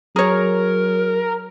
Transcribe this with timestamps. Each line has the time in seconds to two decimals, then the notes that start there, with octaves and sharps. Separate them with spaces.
0.16 F#3 G#4 A#4 C#5